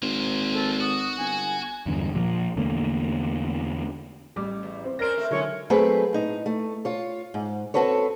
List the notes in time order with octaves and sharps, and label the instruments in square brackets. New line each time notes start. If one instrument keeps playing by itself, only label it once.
[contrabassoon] G#1 [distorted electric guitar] A#3 C5
[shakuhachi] A4
[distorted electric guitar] F#4 [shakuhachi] D#6
[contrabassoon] G1 [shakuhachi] G#5
[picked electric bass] E2 G2 D3
A#2 F3 F#3 A#3
E2 D3 A3 A#3
[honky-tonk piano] A1 G3 D6
[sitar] E2
[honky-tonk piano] C4 C5
[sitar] C#4 D4 C5 [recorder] A#4 [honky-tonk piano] A#6 D7
[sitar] A3 C4
[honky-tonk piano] D3 F#3 [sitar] G#3 C#4 [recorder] C#5
[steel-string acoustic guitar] F#3 A3 C4 G#4 B4
A2 D#4
A3
F4 C#5
G#2
C4 F#4 A4 B4 C#5